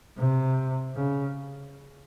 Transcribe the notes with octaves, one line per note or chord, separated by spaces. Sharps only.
C3
C#3